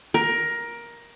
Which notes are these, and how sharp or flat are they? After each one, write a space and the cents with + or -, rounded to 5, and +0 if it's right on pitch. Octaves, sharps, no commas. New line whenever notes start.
A#4 +15